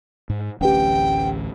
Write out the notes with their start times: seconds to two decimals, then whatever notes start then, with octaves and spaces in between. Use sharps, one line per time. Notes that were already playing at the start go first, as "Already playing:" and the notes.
0.30 G#2
0.61 D1 A1 C#4 G4 B4 F#5 G5